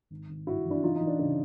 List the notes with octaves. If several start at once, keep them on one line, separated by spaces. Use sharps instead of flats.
G#1
G#1
G2 E4 F#4
E3
D4 E4
E3 D#4 F4
D#4
E3
D4
C#3 D4